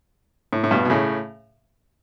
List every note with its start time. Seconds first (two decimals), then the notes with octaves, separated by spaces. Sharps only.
0.53 A2
0.64 A2
0.71 G2 B2
0.85 B2
0.90 A2 C#3